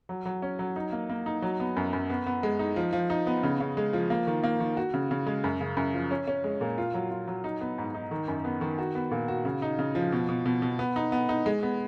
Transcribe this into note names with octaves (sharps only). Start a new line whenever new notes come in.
F#3
F#3
C#4
F#3
D#4
A#3
A#3
D#4
F#3
B3
F#2
F#2
B3
B3
G#3
D#4
F3
F3
D#4
B3
C#3
C#3
G#3
F3
A#3
D#3
A#3
D#3
F#4
C#3
C#3
G#3
F#2
C#3
F#2
F3
C#4
C#4
G#3
A#2
F4
F#3
F4
F#3
D#4
B3
G#2
D#4
D#3
F#2
B3
D#3
F#4
B3
A#2
F#4
C#3
D#4
C#3
F3
B2
B2
B2
B2
B3
D#4
B3
D#4
G#3
B3